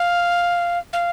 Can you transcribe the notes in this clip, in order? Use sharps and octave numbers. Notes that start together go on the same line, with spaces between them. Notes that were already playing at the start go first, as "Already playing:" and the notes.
Already playing: F5
F5